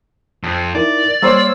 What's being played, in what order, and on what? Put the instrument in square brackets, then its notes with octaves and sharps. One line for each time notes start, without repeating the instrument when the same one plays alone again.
[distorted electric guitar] F2
[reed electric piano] D#4 E4 A#4 [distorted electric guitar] D5
[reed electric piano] G3 [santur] A#3 C5 C#5 [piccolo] E6